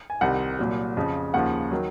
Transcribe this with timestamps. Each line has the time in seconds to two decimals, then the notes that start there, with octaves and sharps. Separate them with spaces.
0.10 G#5
0.21 C2 C3 D#3 F#5
0.59 C2 A#2 F#3
0.97 F2 C#3 F3
1.34 D#2 C#3 F3 F#5
1.71 D#3 F#3